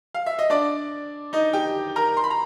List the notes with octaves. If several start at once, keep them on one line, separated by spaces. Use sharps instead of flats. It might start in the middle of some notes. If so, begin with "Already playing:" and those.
F5
E5
D#5
D4 D5
D#4 D#5
G4 G5
A#4 A#5
C6
B5
A#5